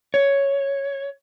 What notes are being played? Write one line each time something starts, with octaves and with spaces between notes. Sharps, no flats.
C#5